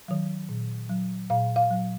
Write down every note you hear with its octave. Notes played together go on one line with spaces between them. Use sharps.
D#3 F#3
A#2
F#3
A#2 F5
F5
F#3